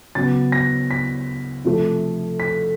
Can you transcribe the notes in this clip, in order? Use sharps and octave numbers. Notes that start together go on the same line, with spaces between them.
C#3 F#3 B3 A6
A#6
B6
C3 F3 A3
B6